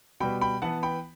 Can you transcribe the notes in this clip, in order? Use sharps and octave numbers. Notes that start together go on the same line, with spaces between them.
B2 G3 B3 G5 B5
G5 B5
E3 B3 F#5 A5
G5 B5